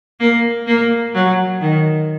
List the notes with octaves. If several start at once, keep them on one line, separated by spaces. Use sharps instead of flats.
A#3
A#3
F#3
D#3